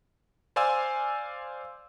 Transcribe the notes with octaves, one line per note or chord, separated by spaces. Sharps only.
C5 D5 F5 G#5 C6 E6